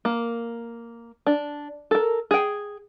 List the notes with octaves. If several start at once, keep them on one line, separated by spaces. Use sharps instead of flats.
A#3
D4
A4 A#4
G#4 G5